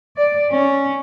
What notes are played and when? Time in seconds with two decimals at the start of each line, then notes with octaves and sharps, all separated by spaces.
0.17 D5
0.52 C#4